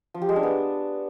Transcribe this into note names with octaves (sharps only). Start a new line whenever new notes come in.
F3
G4
G#3
D4
B3